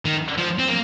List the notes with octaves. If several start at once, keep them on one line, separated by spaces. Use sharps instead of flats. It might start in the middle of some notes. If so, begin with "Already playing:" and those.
D#3
F3
C4
A#3